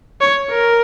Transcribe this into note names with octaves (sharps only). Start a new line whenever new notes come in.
C#5
A#4